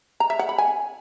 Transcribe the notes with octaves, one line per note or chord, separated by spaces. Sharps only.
A#5
E5
F#5
B5
G#5